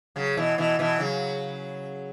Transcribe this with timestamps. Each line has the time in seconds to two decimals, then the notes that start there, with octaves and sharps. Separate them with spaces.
0.16 C#3 F#3
0.37 B2 E3
0.58 B2 E3
0.79 B2 E3
1.00 C#3 F#3